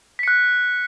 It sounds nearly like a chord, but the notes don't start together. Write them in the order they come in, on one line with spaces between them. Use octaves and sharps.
B6 C#7 F#6